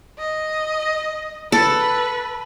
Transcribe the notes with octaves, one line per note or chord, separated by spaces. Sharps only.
D#5
A4 B4